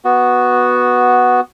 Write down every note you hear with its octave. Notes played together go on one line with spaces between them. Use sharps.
B3 F#4